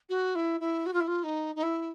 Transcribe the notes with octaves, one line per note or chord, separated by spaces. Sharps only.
F#4
E4
E4
F#4
F4
E4
F4
D#4
D#4
E4